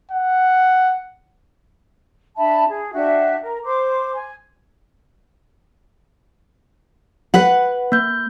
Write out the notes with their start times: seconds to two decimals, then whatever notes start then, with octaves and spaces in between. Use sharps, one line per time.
0.12 F#5
2.38 D4 E5 A5 B5
2.69 G#4
2.93 D4 F#4 E5 G5
3.44 A#4
3.65 C5 D6
4.15 G#5
7.34 B4 F#5
7.92 A#3 G6